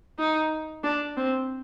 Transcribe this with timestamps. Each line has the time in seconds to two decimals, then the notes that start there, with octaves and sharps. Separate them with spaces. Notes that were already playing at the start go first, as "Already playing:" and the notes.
0.19 D#4
0.83 D4
1.17 C4